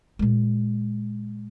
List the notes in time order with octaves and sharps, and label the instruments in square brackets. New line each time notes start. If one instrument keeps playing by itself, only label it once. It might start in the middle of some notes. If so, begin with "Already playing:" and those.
[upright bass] A#2 G#3